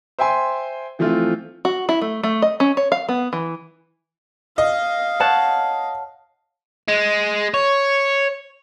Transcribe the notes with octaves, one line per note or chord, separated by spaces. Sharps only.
C5 E5 G5 G#5 C6
E3 F3 A3 C4 F4
F#4
E4
A3
A3
D#5
C#4
C#5
F5
B3
E3
D#5 F5
C#5 F#5 A5
G#3
C#5